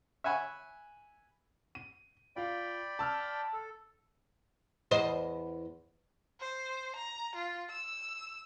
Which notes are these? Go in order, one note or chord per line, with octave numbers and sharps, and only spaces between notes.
E5 F#5 G#5 B5 C#6
D#7
F4 D5 F5 G5 B5
A5 E6 F6
A4
E2 C5 D#5
C5
A#5
F4
E6